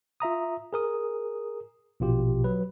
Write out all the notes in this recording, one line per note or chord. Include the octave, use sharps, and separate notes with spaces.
F4 E5 A#5 D#6
G#4 A#4 D#6
A#1 B2 F4 G4
F#3 B4